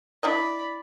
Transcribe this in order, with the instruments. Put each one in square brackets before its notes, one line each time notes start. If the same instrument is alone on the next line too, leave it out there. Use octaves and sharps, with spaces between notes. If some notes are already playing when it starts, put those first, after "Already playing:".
[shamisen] D4 E4 D#5 [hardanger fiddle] D5 B5